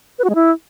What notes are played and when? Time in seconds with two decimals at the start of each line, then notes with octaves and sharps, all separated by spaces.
0.19 B4
0.24 F#4
0.30 G#3
0.35 E4